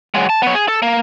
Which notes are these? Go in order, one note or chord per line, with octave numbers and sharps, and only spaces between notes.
F#3 G#3
A5
B3 C#5
G#4
A4
A#3